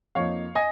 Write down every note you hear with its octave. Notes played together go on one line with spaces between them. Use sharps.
F2 F3 A#3 D#4 C#5 F5
D#5 G#5